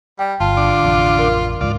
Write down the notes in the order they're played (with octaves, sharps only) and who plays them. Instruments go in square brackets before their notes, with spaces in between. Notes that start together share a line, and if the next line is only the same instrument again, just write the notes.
[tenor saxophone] G3 [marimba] G5
[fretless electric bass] G1 [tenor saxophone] F4 [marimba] A5
[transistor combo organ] D3 D6
[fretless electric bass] A1 F2 C3
[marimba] A#4
[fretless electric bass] C#2 G#2 [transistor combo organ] F4 D5